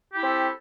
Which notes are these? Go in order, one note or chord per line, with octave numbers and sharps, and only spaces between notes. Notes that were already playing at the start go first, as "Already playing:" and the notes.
C4 E4 G4 A4